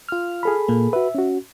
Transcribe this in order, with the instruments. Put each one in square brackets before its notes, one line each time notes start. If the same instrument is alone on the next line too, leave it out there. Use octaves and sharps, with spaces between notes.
[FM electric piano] F4 F6
[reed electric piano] G#4 A4 B5
[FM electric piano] A#2 A#3
[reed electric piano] F#4 B4 [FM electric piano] E5
[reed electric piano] C#4 F#4